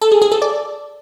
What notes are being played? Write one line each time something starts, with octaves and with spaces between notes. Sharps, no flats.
A4
G#4
G#4
A4
D5